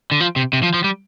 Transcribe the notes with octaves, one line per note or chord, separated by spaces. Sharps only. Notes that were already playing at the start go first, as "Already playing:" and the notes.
D3
F3
C3
C3
F3
F3
G3